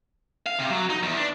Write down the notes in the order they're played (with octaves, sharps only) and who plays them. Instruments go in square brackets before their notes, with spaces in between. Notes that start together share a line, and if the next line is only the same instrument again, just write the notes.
[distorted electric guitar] F5
C3
F#3
D#4
E2
D4